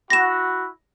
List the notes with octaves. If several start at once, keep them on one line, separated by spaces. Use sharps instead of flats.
E4 F#4 A#6 E7